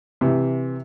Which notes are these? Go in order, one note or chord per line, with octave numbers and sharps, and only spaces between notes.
C3 E3